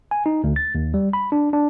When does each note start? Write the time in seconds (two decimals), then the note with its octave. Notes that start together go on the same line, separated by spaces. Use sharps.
0.11 G#5
0.26 D#4
0.44 D2
0.56 A6
0.75 D#2
0.94 G3
1.13 B5
1.32 D4
1.53 D4